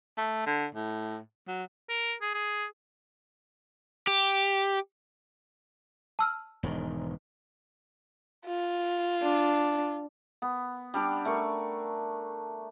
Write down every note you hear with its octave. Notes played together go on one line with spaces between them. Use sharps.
A3
D3
A2
F#3
A#4
G#4
G#4
G4
A5 E6 F6
E1 G#2 D#3
F4
D4
B3
G3 D4 D6
A3 D4 A#4 C#6